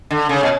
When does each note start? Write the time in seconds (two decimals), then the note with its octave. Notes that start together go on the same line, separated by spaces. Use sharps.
0.11 D3
0.29 C#3
0.43 B2